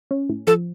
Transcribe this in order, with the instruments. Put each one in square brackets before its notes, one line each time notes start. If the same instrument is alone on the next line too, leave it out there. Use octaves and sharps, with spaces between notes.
[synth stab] C#4
A2
[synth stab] F3 [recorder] A4